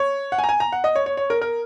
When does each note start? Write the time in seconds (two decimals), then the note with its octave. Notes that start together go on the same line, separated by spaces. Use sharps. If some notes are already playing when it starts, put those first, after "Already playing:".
Already playing: C#5
0.32 F#5
0.39 G#5
0.44 A#5
0.49 G#5
0.60 A#5
0.72 F#5
0.84 D#5
0.96 C#5
1.06 C#5
1.17 C#5
1.30 A#4
1.41 A#4